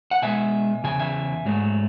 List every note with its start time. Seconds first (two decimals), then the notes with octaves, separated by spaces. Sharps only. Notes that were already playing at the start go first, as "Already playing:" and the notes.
0.11 F#5
0.22 B2 G#3 E5 G#5
0.84 E2 C#3 G#5
0.99 E5 G#5
1.45 G#2 F#3 A3